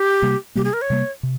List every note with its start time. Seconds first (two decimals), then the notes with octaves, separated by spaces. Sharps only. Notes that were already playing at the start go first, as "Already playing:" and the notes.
Already playing: G4
0.22 C3 G3 A#3
0.55 C3 G3 A#3 G4
0.64 G#4
0.73 A#4
0.82 C#5
0.90 C3 G3 A#3
1.23 C3